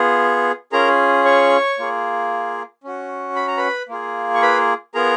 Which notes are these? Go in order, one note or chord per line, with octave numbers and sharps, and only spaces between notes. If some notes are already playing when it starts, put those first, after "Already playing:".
Already playing: B3 F4 G#4
C#4 F4 G#4 A#4 A#5
C#5 C#6
A#3 F4 G#4
C#4 F#4
B5
A#5
B4 B5
A#3 F4 G#4
C#6
B4 B5
B3 F4 G#4 A#4 A#5